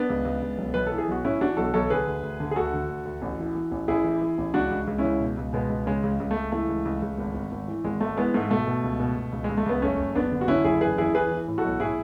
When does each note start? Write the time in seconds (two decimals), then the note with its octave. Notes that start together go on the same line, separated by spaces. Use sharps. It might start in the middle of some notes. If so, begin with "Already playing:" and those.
Already playing: B3 D4
0.09 C#2
0.25 C#2
0.42 C#2
0.58 B1
0.74 B1 B4
0.87 A4
0.92 E3
0.98 G#4
1.08 B1 F#4
1.24 A2 C#4 E4
1.40 E3 D4 F#4
1.57 B1 F#4 A4
1.74 B1 A4 C#5
1.90 D3 G#4 B4
2.07 D2
2.23 D2
2.40 D3
2.51 G#4
2.56 D2 F#4 A4
2.73 D3
2.89 D2
3.05 D2
3.22 A1
3.39 E3
3.55 E3
3.72 A1
3.88 A1 E4 G#4
4.04 E3
4.21 E3
4.38 A1
4.54 C#2 D4 F#4
4.71 C#2
4.87 C#2
4.98 C#4 E4
5.04 C#2
5.20 B2
5.37 C#2
5.53 B2 G#3 B3
5.69 C#2
5.86 C#3 G#3
6.03 C#2
6.20 C#2
6.31 A3
6.36 C#2
6.52 E3 A3
6.68 C#2
6.85 C#2
7.02 C#2
7.18 G#1
7.35 G#1
7.52 G#1
7.68 E3
7.84 G#1 G#3
8.00 G#1 A3
8.17 E3 G#3 B3
8.34 G#2 A3
8.50 B2 A3
8.67 B2
8.83 C#2
9.00 B2
9.16 B2
9.32 C#2
9.44 G#3
9.49 C#2
9.57 A3
9.66 C#2 B3
9.82 F#1 A3 C#4
9.98 F#1
10.15 F#1 B3 D4
10.31 D3
10.41 F#4
10.48 D3 C#4 E4
10.64 F#1 E4 G#4
10.81 E2 G#4 B4
10.98 E2 E4 G#4
11.14 E3 G#4 B4
11.31 E3
11.48 A2
11.58 F#4 A4
11.64 B1
11.80 A2 E4 G#4